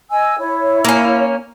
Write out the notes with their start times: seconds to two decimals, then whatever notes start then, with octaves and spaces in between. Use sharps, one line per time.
0.10 D#5 G#5 E6
0.39 E4 C#5
0.85 A#3 C#4